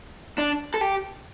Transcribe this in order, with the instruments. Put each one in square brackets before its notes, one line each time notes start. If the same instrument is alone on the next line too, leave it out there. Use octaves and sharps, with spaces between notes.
[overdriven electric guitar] D4
A4
G4